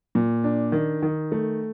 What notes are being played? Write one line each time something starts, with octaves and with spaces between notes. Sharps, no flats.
A#2
D4
D#3
D#3
A3